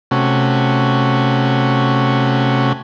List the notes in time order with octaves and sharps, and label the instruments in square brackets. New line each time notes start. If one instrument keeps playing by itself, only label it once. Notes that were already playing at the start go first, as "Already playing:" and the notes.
[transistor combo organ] C3 A3 C#4 F#4